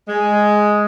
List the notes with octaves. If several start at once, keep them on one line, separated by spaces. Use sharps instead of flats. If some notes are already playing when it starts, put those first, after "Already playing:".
G#3